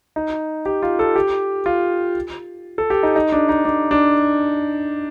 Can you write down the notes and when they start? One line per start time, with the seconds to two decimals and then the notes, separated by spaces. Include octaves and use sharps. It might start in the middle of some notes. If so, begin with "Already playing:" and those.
0.16 D#4
0.66 G4
0.83 F4
0.99 A4
1.16 G4
1.66 F4
2.78 A4
2.90 G4
3.03 D#4
3.16 D#4
3.32 D4
3.49 D#4
3.65 D4
3.91 D4